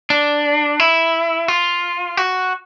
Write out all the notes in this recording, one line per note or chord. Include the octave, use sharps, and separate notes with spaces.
D4
E4
F4
F#4